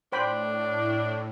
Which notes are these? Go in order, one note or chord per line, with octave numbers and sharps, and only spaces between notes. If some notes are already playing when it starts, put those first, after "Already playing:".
A2 D4 C5 G5 B5